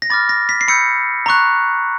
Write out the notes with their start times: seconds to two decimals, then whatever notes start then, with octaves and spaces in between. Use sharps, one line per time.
0.02 A#6
0.10 B5 D6 F6 A6
0.29 A#6
0.49 B6
0.61 C7
0.68 B5 E6 G6 C#7
1.26 A#5 C#6 F#6